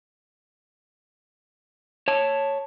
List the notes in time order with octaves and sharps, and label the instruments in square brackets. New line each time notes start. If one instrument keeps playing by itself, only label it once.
[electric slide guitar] C#5 A5